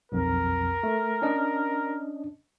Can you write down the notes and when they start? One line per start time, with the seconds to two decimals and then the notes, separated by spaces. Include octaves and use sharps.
0.12 B1 F2 A#4
0.83 A3
1.22 C#4 D4 D#5